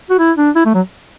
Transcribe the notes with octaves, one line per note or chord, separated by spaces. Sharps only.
F#4
E4
D4
E4
A3
F#3